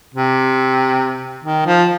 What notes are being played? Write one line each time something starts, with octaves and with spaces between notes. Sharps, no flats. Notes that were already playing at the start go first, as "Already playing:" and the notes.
C3
D#3
F3